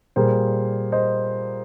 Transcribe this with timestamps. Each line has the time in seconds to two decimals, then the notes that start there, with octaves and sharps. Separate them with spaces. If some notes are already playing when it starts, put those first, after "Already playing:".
0.16 A#2 G3 A#3 G#4 C5
0.92 C5 D#5